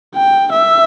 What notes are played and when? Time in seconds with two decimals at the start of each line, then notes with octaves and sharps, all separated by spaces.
0.15 G5
0.53 E5